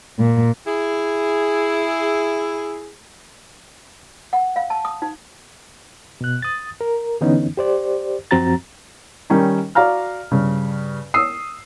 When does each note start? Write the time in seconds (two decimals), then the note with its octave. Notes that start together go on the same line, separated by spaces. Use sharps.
0.19 A#2
0.66 E4 G#4
4.33 F#5
4.56 F5
4.70 A5
4.85 D#6
5.02 D#4
6.21 B2 F#6
6.42 D#6 A6
6.81 A#4
7.21 D3 E3 B3 C#4 D#4
7.57 G4 C5 D5
8.31 F#2 F3 C4 F#4 A#5 A6
9.30 D#3 G3 C#4 D#4
9.75 F#4 D5 F5 A#5 F6
10.32 G2 C#3
11.14 D#6 E6 C7